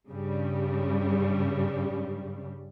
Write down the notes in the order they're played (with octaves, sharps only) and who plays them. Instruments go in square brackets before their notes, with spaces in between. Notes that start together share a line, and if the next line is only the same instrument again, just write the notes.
[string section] G2 C#3 G3